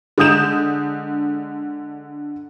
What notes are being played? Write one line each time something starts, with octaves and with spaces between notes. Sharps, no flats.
D3 G#3 D#6 G6 E7